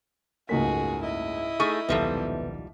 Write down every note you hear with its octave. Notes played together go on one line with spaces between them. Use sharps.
F#1 C#2 G#2 A3 A#3 F#4 G#4 B6
E4 D#5
A3 D#4 G#4 C#6 F6 B6
D#1 B1 G#2 F3 G3 B3 A4 E5